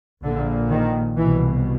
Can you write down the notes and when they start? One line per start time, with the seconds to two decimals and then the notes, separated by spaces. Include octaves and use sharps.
0.23 A#1 A#2 D3
0.71 D#3
1.17 C2 B2 E3